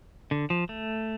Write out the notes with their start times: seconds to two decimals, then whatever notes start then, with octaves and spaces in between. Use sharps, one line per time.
0.31 D3
0.50 F3
0.69 A3